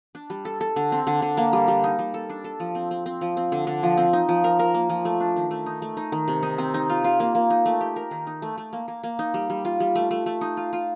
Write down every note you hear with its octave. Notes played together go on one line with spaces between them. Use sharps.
D4
G3
A4
A4
D3
C4
D3
D3
A#3
G3
G3
D#4
G3
A4
D4
A4
F3
C4
C4
C4
F3
C4
D3
D3
F3
C4
D#4
F3
A#4
A#4
A#3
F3
A3
D4
D#3
A3
D#4
A3
D#4
D#3
C3
D#4
C4
D#4
F4
F4
A#3
A#3
D#4
A3
G4
A#4
D#3
D#4
A3
A3
A#3
A#3
A#3
D#4
G3
G3
F4
G3
A3
A3
A3
D#4
F4
F4